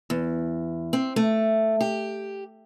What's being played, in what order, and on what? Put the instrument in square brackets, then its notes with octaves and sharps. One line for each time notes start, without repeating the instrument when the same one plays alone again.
[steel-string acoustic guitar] E2
C4
A3
G4